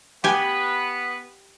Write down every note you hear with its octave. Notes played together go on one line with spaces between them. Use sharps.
B3 G4 B4 G#5